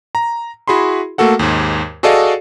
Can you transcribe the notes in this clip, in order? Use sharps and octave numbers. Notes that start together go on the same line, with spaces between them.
A#5
E4 F#4 G#4 B5 C6
A3 A#3 F#4 A4 F#5
D#2 G#2
F#4 G#4 A4 D5 D#5 F5